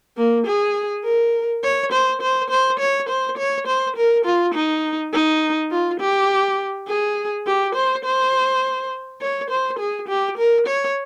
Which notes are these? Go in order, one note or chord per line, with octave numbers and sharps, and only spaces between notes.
A#3
G#4
A#4
C#5
C5
C5
C5
C#5
C5
C#5
C5
A#4
F4
D#4
D#4
F4
G4
G#4
G4
C5
C5
C#5
C5
G#4
G4
A#4
C#5